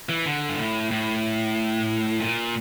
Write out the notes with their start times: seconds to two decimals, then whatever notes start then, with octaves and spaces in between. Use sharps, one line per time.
0.09 E3
0.26 D3
0.49 G2
0.58 A2
0.91 A2
2.20 A#2